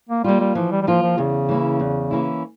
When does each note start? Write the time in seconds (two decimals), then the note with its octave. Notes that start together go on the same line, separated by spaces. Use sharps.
0.09 A#3
0.24 G3 A#3 F4
0.40 G3
0.55 E3 F3
0.71 G3
0.82 G3
0.87 F3 A#3 F4
1.03 F3
1.18 E2 C#3
1.49 E3 A#3 C#4 E4
1.80 E2
2.11 E3 A#3 C#4 E4